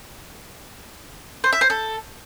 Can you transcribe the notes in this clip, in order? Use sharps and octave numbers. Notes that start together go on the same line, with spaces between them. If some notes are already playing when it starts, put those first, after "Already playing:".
C5
E5
C5
A4